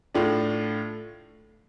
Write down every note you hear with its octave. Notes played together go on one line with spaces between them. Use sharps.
A2 A3 D4 F4